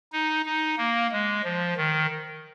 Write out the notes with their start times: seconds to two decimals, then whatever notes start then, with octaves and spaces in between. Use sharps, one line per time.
0.12 D#4
0.46 D#4
0.78 A#3
1.12 G#3
1.44 F3
1.77 D#3